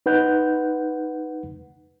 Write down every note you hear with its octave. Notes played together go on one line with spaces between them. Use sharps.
D#4 B4 F#5 G6